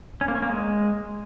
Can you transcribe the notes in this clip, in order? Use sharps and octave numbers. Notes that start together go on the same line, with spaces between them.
C#4
A#3
C#4
A#3
G#3